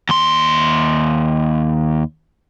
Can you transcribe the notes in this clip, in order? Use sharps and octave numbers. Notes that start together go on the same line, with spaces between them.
D#2 C6